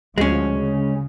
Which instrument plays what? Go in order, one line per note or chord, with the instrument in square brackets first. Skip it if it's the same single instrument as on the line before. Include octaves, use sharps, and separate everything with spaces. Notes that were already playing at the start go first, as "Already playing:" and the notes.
[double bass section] D2 F3 [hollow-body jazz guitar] G#3 C#4
[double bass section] C#3